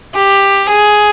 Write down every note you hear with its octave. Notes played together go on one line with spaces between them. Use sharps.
G4
G#4